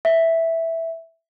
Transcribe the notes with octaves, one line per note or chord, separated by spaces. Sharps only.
E5